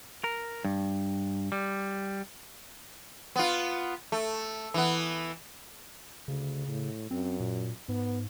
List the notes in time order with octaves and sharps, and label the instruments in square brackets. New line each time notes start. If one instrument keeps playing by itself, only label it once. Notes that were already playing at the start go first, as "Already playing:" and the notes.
[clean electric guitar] A#4
G2
G3
[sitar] B3 F4
A3
E3 B3
[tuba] D2 [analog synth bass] C#3
[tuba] A2
[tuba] F#2 [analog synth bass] C4
[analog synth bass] A#2
[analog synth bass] G#2 [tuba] B3